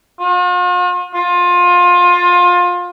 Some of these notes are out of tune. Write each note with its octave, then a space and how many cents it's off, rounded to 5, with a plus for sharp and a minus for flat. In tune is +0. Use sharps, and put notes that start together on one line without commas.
F4 +45
F4 +25